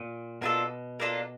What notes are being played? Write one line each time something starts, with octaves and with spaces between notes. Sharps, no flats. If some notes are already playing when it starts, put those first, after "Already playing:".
Already playing: A#2
B2 A#3 D4 F4 A4
A#3 D4 F4 A4